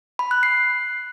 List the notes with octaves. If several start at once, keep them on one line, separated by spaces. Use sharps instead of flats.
B5
F#6
C7